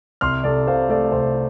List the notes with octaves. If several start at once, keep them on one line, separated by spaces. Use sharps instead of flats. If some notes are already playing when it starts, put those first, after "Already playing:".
C2 C6 F6
C2 A4 D5
C3 C5 F5
A3 A4 D5
C2 C5